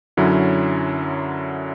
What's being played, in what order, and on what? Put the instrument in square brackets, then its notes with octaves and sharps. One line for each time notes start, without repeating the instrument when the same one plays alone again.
[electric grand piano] F#2 D3 F#3 C#4 E4